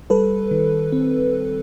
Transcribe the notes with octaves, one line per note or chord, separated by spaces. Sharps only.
G3 A4 B4
D#3
C4